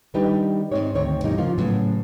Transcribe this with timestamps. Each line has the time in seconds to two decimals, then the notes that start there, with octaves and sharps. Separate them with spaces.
0.14 D#3 G3 D4 D#4 G4 B4
0.71 G#2 B2 C4 D#4 C#5
0.95 D2 D#3 C4 C#5
1.24 G2 B2 E3 G3 A#3 D#4
1.38 C#3 F3 A#3 F4
1.58 A2 C#3 F#3 B3